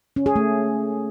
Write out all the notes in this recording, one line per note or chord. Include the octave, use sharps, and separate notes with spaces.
C#4
G#4
A3